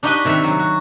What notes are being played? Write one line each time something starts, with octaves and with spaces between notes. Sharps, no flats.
D4 D#4 F#4 G4 B4 D#5
C3 D#3 E5 F#5
F#3
F#4